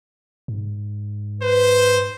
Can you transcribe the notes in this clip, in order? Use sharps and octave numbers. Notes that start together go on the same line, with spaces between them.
G#2
B4 C5